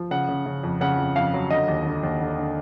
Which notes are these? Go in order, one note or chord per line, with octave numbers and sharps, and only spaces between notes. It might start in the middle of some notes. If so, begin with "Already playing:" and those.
Already playing: F3
C#3 F#5
C#3
C#3
F2
C#3 F#5
F2
F2 F5
F#3
D3 D#5
D#2
D3
D#2
D3
D3